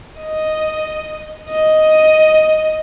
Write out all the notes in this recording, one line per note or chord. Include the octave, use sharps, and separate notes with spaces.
D#5
D#5